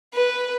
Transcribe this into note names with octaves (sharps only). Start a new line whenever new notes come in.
B4